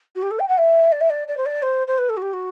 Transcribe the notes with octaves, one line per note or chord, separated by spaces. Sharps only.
F#4
G4
A4
G5
F#5
E5
D5
E5
D5
D5
C5
D5
C5
C5
B4
A4
F#4
G4
F#4